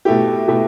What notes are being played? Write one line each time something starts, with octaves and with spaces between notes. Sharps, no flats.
B2 A3 E4 G4
B2 A3 E4 G4